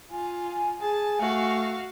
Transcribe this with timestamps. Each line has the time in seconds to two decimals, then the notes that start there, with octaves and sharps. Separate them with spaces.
0.11 F4 G#5
0.81 G#4 A5
1.21 A3 F#4 F5